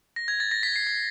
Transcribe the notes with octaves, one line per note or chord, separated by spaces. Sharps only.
A#6
G#6
A6
A#6
B6
C7
B6